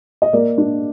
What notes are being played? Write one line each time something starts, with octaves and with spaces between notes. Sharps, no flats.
D#5
A#3 A#4 D5
D4